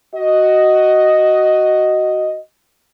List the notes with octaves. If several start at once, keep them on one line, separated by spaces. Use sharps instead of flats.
F#4 D#5